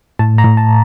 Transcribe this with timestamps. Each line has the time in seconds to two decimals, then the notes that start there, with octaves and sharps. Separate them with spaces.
0.19 A2 A5
0.38 A#5
0.44 A2
0.57 A5